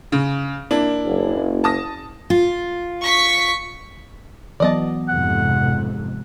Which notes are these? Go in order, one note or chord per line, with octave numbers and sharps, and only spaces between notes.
C#3
A#3 D4 E4
F#1
A5 D#6 A#6
F4
C#6 B6
E3 F#3 B3 D5 D#5 A5
F2 G#2 C3 F#5